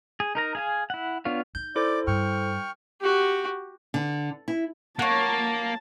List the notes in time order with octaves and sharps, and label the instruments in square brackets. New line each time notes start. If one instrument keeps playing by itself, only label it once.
[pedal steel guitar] G#4
D#4 A#4 A#5
G#4 F5 G#5
E4 F#5
B3 D4 F4 C#5 F5
[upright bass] D#4 [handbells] G6
[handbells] E4 A4 C5 [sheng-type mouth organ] D5 D6
[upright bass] G2 [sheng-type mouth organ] G5 C#6 F6
[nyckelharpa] F#4 G4
[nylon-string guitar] D3
E4
[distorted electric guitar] A#3 [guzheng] C#5 F#5 [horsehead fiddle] A5